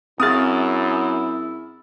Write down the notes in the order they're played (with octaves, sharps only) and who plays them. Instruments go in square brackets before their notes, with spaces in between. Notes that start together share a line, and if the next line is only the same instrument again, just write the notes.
[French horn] F#2 [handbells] C4 G#4 [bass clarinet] E4 [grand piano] D#6 F6 A6